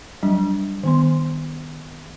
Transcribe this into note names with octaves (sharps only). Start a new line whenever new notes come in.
F#3 G3 D4
D#3 B3 C6